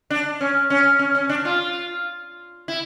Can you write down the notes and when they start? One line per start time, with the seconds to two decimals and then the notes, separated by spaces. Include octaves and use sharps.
0.10 D4
0.41 C#4
0.70 C#4
0.99 C#4
1.15 C#4
1.29 D4
1.45 F4
2.68 E4